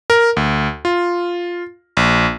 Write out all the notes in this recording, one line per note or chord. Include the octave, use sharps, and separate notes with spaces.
A#4
D2
F4
A#1